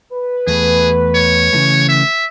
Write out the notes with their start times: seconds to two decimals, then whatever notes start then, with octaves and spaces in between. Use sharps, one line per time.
0.12 B4
0.47 E2 A3 G#4
1.15 C#5
1.53 C#3 E3 A3
1.89 E5